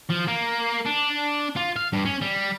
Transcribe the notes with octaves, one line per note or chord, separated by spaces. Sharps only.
F3
A#3
D4
F4
F5
G2
C#4
G3